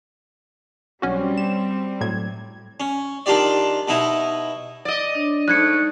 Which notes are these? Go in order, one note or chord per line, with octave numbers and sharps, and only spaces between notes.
B1 G3 C4 C#4 F#4
E7
A2 F#3 G#6
C#4
D#3 D4 F4 G4 D5
B2 D#4 E4
D5 D#5
D4 C#5
G#2 A3 D#4 F#6 G#6 C#7